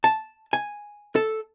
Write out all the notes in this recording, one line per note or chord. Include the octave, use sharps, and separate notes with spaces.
A5
G#5
A4